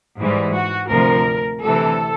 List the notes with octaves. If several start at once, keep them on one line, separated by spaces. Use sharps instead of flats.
G#2 E3 G3
F#4
D2 C3 F3 A#4
D2 C3 E3 A4